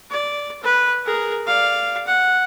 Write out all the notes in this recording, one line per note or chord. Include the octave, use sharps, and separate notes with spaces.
D5
B4
G#4 A#4
D5 F5
F#5